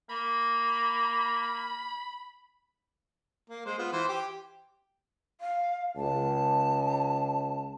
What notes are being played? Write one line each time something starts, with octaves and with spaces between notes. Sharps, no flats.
A#3 B5
A#3
G#3 C5
B3 F4
E3 C5
G4
F5
C#2 A5